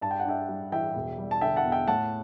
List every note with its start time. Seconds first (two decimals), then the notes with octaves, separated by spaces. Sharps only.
0.01 G2 A5
0.11 G5
0.20 F#5
0.25 D4 E5 G5
0.49 G3
0.72 E3 E5 G5
0.96 E1
1.18 G3
1.31 A5
1.41 D3 E5 G5
1.56 F#5 A5
1.65 E2
1.72 E5 G5
1.87 A2 F#5 A5